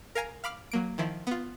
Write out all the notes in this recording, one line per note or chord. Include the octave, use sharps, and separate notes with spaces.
A#4 F5 G#5 A#5
F5 B5 D6 F6
F#3 A#3 D7
D#3 F3 E4
B3 F4